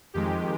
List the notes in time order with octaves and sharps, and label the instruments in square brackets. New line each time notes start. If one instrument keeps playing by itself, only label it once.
[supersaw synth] F2 D#3 G#3 G4